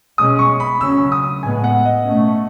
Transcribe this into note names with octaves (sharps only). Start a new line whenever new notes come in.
B2 G#3 C#4 D#6
C#6
B5
C#3 F#3 C#4 E6
D#6
A2 G#3 B3 G#5
F#5
D#5
B2 A3 C#4